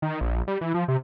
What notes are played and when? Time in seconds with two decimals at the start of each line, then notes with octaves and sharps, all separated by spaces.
0.02 D#3
0.21 A#1
0.48 G3
0.61 E3
0.74 F3
0.88 C3